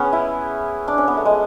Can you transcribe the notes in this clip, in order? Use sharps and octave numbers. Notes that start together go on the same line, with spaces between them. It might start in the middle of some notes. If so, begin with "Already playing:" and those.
Already playing: B3 C#4 G#4
E4
D4
C#4
B3
A3
G#3